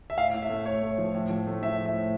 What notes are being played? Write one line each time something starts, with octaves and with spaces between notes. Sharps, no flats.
E5
A2 F5
A2
E5
A3
A2 C#5
A3
F3
A2
F3
A3
F3 E5
A2
E5
A2